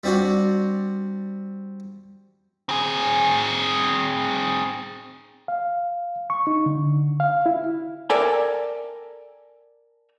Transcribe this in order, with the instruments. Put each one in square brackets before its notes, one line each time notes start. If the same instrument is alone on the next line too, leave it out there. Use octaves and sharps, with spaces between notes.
[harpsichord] G3 C4 D4 F#4
[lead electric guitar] C4 G#4
[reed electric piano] F5
C#6
D#4
D3
F5
E4
[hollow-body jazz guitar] A4 A#4 D5 E5 G5 G#5